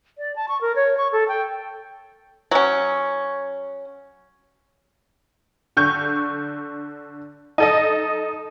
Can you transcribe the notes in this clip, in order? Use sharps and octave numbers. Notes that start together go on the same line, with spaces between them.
D5
A5
C#6
A#4
C#5
C#6
A4
G5
F#3 C#4
D3 C#6 G6
D#4 A4 D#5